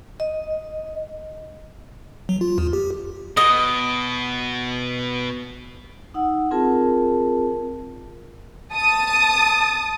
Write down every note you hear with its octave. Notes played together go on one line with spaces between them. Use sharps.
D#5
F#3
F4
E2
G4
B2 D#5
D#4 F#5 E6
C4 F4 G#4 A#4 A5
A5 D#6